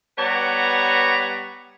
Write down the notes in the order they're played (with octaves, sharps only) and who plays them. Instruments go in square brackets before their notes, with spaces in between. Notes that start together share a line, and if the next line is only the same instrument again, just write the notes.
[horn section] G3 B3 B4 C#5 F#5 A#5